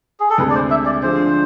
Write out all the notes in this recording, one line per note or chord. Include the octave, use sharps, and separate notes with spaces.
G#4
A4
D2 C3 G#3 B4
D5
C5
E5
D5
D3 F3 G#3 D4 C5